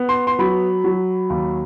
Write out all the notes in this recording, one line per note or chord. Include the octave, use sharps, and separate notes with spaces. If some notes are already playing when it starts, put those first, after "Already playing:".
Already playing: B3
C6
C6
F#3 B5
F#3
D#2